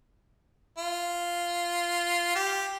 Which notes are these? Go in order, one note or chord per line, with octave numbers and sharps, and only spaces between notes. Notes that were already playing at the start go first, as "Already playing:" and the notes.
F4
G4